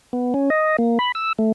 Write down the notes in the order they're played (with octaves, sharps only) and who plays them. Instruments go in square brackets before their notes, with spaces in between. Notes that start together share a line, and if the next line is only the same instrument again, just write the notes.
[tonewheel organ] B3
C#4
D#5
A#3
B5
E6
A3